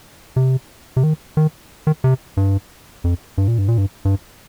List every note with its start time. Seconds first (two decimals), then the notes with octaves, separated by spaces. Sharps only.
0.36 C3
0.97 C3
1.03 D#3
1.37 D#3
1.87 D#3
2.04 C3
2.37 G2
3.04 F2
3.38 G2
3.48 A#2
3.58 G2
3.68 A#2
3.78 G2
4.05 G2